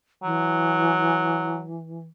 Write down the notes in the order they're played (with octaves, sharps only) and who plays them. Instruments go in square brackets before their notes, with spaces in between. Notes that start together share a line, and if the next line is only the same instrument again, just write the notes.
[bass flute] E3 [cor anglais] F#3